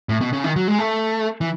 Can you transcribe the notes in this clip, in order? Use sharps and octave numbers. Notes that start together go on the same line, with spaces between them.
A2
B2
C#3
D#3
F#3
G#3
A3
E3